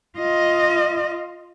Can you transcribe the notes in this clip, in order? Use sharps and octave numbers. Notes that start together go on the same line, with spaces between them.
F4 D#5